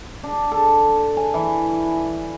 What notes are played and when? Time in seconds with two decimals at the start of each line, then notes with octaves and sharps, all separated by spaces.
0.24 D4
0.52 A4
1.17 G#5
1.34 E3